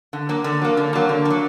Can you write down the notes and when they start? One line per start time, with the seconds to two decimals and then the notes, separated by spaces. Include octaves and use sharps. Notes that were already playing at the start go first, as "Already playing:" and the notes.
0.13 D3
0.29 F#3 A#3
0.44 D3
0.62 F#3 A#3
0.77 D3
0.93 F#3 A#3
1.09 D3
1.25 A#3
1.30 F#3